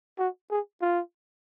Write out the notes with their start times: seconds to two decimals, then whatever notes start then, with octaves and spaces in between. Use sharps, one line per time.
0.19 F#4
0.51 G#4
0.82 F4